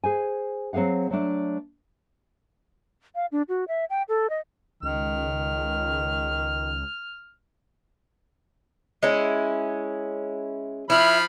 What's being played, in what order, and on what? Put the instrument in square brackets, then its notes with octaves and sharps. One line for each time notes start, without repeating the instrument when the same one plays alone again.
[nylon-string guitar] G#4 C5 G#5
F#3 C4 G#4 F5 F#5
F#3 A3 D4
[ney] F5
D4
F#4
E5
G5
A4
D#5
[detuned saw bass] C#2 [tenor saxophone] D#3 [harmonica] F6
[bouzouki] G#3 C#4 E4
[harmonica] F3 B5 F6 [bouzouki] E4